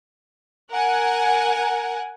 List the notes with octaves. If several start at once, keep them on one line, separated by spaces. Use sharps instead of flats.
A#4 F#5 G#5